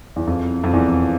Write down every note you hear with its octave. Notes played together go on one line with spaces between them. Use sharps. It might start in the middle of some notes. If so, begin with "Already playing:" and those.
E2
F2
F2
E2